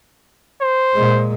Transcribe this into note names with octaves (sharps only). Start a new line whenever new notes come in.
C5
A#2 G#3